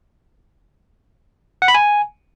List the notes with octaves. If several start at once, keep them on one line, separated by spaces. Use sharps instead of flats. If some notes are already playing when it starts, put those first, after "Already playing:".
F#5
B5
G#5